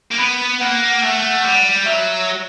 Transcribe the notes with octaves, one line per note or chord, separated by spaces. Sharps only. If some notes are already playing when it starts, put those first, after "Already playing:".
A#3
B3 B5
A#3 F#5
A3 F#5
G3
F#3 E5